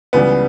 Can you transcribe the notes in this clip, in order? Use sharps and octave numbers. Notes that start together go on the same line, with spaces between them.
C#2 C#3 E3 G3 B3